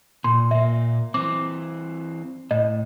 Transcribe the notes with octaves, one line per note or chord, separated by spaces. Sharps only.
A#2 C6
A#2 A#3 E5
E3 C4 D6
A2 D#5